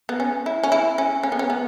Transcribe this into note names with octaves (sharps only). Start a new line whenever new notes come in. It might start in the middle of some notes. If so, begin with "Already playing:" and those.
B3
C#4
E4
C#4
E4
C#4
C#4
B3
C#4
B3